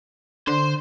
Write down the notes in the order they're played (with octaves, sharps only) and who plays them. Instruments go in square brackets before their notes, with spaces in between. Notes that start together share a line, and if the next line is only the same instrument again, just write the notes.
[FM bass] D3 [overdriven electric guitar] C5